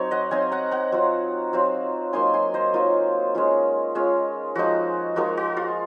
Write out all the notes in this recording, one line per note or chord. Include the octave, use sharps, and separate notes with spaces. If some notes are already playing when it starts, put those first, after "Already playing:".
Already playing: F#3 C4 D#4 C#5
D#5 F#5
F#3 C4 D#4 F5 G#5
F#5 A#5
F#5 A#5
F#3 C4 F4
F#3 C4 F4
F#3 A#3 D#4 G#5 C6
G#5 C6
C5 D#5
F#3 A#3 D#4 F4
G#3 C#4 F4
G#3 C#4 F4
F3 G#3 D#4 F#4
F3 G#3 D#4 F#4 A#4
F#4
F4